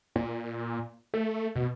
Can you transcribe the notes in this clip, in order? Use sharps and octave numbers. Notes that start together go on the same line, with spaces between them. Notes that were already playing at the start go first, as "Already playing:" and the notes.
A#2
A3
B2